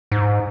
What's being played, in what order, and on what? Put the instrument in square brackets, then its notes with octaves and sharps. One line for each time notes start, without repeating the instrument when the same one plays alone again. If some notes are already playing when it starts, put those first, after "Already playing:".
[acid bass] G#2